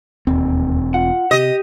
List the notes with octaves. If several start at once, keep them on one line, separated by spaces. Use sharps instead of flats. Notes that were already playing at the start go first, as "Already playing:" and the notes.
E1 D#2 C4
F4 F#5
C3 G4 D#5